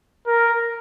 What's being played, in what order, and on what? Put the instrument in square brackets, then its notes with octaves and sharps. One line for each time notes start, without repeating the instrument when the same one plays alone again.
[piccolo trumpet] A#4